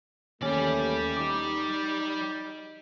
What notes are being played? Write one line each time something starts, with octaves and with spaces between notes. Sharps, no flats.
D#2 E3 A3 C#4 G4 D5
D#4 D6